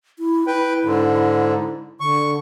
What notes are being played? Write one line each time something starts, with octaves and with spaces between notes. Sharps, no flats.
E4
E4 B4 G5
G#2 D3
D3 C#6